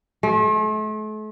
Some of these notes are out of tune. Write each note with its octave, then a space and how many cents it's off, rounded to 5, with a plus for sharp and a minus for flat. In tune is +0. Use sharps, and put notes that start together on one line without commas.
A3 -40